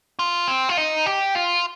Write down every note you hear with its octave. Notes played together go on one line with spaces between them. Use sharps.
F4
C4
F4
D#4
G4
F4